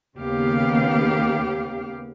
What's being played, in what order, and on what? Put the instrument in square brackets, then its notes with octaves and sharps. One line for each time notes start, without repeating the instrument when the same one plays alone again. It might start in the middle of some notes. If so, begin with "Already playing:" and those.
[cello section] D#2 C#3 B3 G4 F5